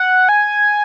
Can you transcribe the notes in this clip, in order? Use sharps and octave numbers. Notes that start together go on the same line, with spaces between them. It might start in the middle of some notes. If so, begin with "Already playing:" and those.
Already playing: F#5
G#5